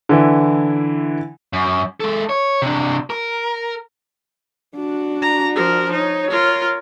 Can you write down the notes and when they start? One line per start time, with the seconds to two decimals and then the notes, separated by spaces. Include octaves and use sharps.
0.09 D3 E3 E4
1.53 F#2
2.00 G#3 A4
2.29 C#5
2.62 C3 D4
3.10 A#4
4.76 D4 F#4
5.22 A#5
5.55 F3 A#4
5.93 D#4 C#5
6.31 F4 A#4